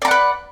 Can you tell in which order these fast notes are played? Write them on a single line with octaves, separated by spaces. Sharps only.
D5 A#5 F#5 B4